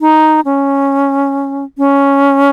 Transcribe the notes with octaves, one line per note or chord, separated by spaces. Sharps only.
D#4
C#4
C#4